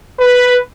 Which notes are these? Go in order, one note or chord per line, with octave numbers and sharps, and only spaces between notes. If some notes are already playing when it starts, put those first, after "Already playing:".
B4